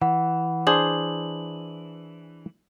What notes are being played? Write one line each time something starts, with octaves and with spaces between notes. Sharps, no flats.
E3 F#5
D4 G#4 C5 F#7